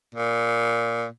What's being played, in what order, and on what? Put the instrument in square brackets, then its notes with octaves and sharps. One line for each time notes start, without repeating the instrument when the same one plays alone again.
[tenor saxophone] A#2